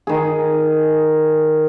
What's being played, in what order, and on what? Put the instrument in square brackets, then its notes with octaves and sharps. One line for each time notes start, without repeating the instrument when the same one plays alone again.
[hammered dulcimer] D#3 G#4